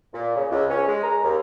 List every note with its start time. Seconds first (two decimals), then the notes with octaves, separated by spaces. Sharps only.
0.14 A#2
0.36 C#3
0.51 C#2
0.70 C#4
0.88 G#3
1.03 A#5
1.24 D#2